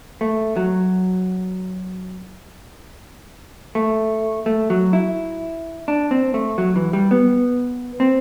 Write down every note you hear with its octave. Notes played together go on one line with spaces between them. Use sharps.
A3
F#3
A3
A3
F#3
E4
D4
C4
A3
F#3
E3
G3
B3
C4